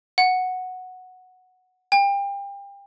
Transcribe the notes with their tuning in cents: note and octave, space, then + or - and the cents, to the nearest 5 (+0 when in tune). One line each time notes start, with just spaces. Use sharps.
F#5 -5
G5 +30